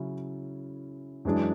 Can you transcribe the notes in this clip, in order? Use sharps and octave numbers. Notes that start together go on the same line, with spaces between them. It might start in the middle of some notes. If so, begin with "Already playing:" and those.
Already playing: C#3 F#3 C#4 E4
F#2 E3 G#3 D4